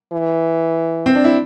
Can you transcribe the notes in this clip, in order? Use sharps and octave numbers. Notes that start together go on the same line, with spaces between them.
E3
C4
D4
E4